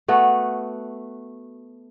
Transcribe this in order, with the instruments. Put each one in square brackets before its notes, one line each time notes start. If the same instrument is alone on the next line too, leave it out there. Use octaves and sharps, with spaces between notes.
[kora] A3 B3 F#4